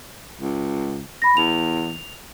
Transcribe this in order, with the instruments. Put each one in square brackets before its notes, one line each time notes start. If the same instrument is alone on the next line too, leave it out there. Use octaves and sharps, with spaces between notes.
[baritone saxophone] C#2
[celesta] B5 A#6
[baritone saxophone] E2 [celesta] F7